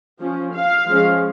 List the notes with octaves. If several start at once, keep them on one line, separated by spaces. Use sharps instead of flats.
F3 C#4
F5
F3 G#3 C#4